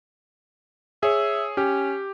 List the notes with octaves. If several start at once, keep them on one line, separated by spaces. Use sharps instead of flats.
G#4 C#5 E5
C#4 G4